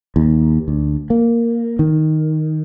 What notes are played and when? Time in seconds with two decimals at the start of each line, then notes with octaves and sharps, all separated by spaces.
0.16 D#2
0.68 D2
1.10 A#3
1.79 D#3